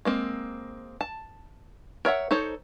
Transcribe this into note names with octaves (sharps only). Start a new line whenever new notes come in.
G#3 A#3 C4
A5
A#4 C#5 E5 F#5
D#4 A4 C5 C#5